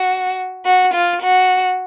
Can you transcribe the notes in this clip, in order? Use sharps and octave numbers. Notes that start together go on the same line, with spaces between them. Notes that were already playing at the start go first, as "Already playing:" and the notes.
Already playing: F#4
F#4
F4
F#4